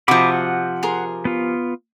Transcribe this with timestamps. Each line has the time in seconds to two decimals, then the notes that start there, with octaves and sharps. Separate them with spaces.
0.08 C3 F3 F#4 D#5 B5 D6
0.33 F#5
0.83 G#4 A#4 C6
1.25 B3 F4